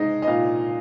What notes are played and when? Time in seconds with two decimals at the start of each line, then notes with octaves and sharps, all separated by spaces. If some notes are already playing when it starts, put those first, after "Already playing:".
Already playing: G#3 D#4 D#5
0.22 D#5
0.27 A#2 F5